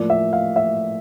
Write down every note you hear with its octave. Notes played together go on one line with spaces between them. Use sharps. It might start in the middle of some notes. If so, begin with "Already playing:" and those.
Already playing: A2 F3 A#3 D5
E5
F5
E5